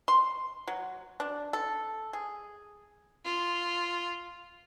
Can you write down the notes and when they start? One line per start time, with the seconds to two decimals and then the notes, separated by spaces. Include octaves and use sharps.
0.08 C6
0.67 F#3
1.20 D4
1.53 A4
2.13 G#4
3.25 F4